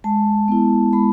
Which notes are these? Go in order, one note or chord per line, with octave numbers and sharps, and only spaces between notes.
G#3 A5
B3 E4
G#3 B5